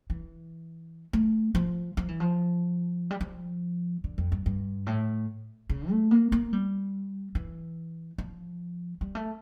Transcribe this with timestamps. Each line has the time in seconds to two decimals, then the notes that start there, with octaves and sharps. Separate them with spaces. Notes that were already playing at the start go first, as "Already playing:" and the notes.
0.10 E3
1.13 A3
1.55 F3
1.97 F3
2.08 E3
2.20 F3
3.11 G3
3.21 F3
4.04 D3
4.18 F2
4.32 G2
4.46 G2
4.87 A2
5.69 C#3
5.90 A3
6.11 A#3
6.32 A#3
6.53 G3
7.35 E3
8.18 F3
9.01 G3
9.15 A3